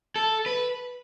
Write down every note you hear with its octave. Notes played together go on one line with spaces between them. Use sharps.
A4
B4